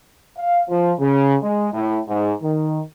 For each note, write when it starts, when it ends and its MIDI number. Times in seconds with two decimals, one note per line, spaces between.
0.37 0.63 77
0.69 0.92 53
0.99 1.35 49
1.42 1.68 56
1.73 1.98 45
2.07 2.33 44
2.42 2.81 51